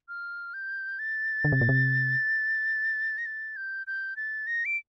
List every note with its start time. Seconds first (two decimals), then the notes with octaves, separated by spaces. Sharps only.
0.09 F6
0.54 G6
0.99 A6
1.45 D3
1.52 C3
1.61 A#2
1.69 C3
3.18 A#6
3.26 A6
3.56 G6
3.87 G6
4.17 A6
4.47 A#6
4.65 D7